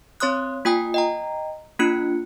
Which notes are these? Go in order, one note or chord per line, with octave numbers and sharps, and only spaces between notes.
C4 C#5 C6 D#6 F#6
A#3 F4 G5 G#5 D#6
D#5 G5 A#5
A#3 D4 F4 F#6 C#7